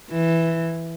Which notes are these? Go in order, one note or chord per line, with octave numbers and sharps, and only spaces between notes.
E3